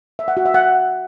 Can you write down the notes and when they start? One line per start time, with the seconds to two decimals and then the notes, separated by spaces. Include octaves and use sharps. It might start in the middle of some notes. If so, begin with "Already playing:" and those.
0.19 E5
0.28 F#5
0.37 F#4
0.46 E5
0.54 F#5